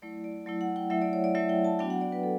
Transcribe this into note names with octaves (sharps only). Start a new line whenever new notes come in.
F#3 A3 E4 D5
D5
F#3 A3 E4
F#5
G5
F#3 A3 E4 E5
D5
C#5
D5
F#3 A3 E4 E5
G5
A5
F#3 B3 D4 F#4 G5
F#5
D5
B4
A4